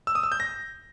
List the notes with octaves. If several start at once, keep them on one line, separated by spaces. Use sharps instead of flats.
E6
D#6
E6
G6
A#6